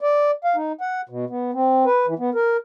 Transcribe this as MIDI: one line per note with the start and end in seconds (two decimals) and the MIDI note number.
0.01 0.31 74
0.44 0.56 77
0.56 0.72 63
0.81 1.01 78
1.09 1.25 47
1.30 1.51 59
1.54 1.85 60
1.86 2.06 71
2.07 2.14 52
2.19 2.30 59
2.34 2.57 70